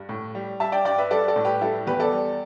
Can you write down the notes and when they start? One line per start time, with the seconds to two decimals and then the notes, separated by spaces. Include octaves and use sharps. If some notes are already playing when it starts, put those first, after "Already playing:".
Already playing: G2
0.09 A2
0.35 G3
0.60 G3 E5 A5
0.72 D5 G5
0.85 G2 D5 G5
0.98 B4 E5
1.11 G3 A4 D5
1.28 A4 D5
1.36 A2
1.45 G4 B4
1.61 G3 E4 A4
1.87 E2 G4 B4
2.00 A4 D5
2.12 G3